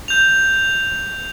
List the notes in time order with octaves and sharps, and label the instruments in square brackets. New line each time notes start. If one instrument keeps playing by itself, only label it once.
[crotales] G6 F7